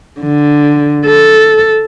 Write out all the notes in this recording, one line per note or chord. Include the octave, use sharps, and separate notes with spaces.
D3
A4